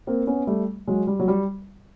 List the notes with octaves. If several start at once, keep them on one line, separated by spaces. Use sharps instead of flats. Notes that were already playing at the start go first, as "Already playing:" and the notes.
A#3 C4
B3 C#4
G3 A3
F#3 G#3
G3
F#3
G3